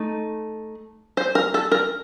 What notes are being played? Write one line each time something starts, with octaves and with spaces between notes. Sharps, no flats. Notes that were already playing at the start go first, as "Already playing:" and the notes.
Already playing: A3 D#4
C5
A#4
A4
A#4